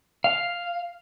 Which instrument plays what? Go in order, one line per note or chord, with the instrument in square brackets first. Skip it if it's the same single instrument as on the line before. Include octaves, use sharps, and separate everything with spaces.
[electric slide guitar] F5